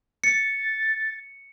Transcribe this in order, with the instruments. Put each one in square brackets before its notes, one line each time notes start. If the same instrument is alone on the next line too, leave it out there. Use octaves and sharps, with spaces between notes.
[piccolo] A6 [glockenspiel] C#7